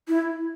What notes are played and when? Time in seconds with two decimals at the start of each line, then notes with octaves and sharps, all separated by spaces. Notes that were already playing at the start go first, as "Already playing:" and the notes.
0.08 E4